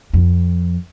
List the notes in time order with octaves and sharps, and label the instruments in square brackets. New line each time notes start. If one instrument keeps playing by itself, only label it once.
[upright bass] F2